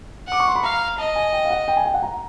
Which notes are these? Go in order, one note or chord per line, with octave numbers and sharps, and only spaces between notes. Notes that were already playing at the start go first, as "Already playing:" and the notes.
F#5 D6
C#6
C6
B5
F5 A#5
D#5 A5
G#5
G5
F5
F#5
G5
G#5
G5
F#5
A#5